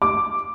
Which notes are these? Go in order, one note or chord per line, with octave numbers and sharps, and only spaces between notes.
D6